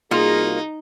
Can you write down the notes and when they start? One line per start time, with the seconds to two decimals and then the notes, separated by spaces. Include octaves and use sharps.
0.11 C2 A#3 D#4 F4 F#4 G#4